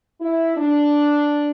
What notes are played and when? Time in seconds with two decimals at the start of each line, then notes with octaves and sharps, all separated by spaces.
0.20 E4
0.57 D4